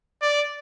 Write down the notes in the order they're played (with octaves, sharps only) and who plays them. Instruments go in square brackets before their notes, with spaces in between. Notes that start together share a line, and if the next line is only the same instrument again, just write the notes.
[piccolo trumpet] D5